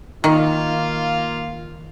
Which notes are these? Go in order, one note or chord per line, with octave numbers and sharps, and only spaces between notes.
D#3 A#3 F4